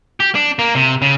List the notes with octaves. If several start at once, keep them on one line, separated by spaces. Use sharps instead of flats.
G4
D4
A#3
C3
C#3